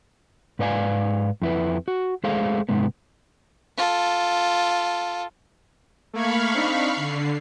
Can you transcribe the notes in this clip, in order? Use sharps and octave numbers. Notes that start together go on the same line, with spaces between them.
G#2 B4 D5 F5 G#5
F2 E4 B4
F#4
G#3 A3 G#4 A4 C5 F5
G#2 C3 G#3 B3
F4 A4
A3 A#3 F5 B5 C#6 G#6
C4 D4 D#4
D3 C7